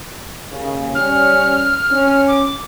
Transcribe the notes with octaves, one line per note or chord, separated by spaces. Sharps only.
D#2 C#3
G3 C#4 F6
C#4
D6